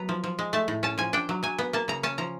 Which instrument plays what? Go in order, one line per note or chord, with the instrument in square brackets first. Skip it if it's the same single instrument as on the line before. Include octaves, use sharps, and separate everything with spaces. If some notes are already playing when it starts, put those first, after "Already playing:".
Already playing: [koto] F#3 B3 A#5
F3
F3
G#3
A3 A5
A2
C#4 A5
F3 G#5
D4 G5
F#3
F#3 G#5
B3
A#3 A5
C#3 A#5
C#4 A5
F3 A#5